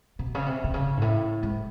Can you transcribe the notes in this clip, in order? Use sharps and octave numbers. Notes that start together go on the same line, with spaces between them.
B2
C#3
C3
C3
C#3
G#2
A2
G#2